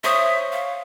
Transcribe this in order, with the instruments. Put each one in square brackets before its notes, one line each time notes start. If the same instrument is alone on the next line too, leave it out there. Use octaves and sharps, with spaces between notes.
[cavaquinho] C5 C#5 D#6 [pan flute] E5
[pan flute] F5